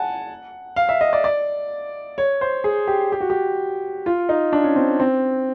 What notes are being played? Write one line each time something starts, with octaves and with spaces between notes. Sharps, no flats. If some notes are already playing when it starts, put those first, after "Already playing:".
Already playing: F#5 G#5 A5
F5
E5
D#5
D5
D5
C#5
C5
G#4
G4
G4
F#4
G4
F4
D#4
D4
C#4
C4
C4